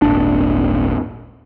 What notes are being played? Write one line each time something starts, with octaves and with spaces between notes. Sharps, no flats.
D#1 G#1 D4